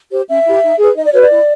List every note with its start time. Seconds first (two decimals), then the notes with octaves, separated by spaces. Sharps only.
0.11 G4 C5
0.28 C#4 E5
0.45 E4 G4
0.63 D#4
0.79 G#4 B4
0.96 D#4 D#5
1.05 D5
1.13 F#4 B4 C#5
1.21 D5
1.30 E4